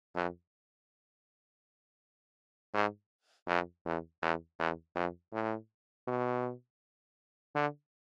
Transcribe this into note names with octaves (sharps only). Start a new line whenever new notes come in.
F2
G#2
F2
E2
E2
E2
F2
A2
B2
D3